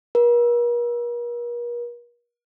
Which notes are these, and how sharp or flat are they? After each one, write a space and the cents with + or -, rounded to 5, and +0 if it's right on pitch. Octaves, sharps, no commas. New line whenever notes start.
A#4 +45